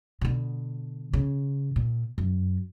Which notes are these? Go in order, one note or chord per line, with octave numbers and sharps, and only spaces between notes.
B2 D3
C#3
A#2
F#2